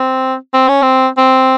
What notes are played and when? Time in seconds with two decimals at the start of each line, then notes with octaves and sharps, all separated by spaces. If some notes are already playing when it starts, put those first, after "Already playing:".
Already playing: C4
0.54 C4
0.68 C#4
0.82 C4
1.18 C4